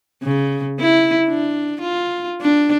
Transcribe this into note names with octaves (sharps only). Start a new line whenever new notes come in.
C#3
E4
D4
F4
D4